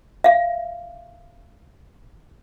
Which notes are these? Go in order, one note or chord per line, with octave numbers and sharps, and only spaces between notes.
E5 F5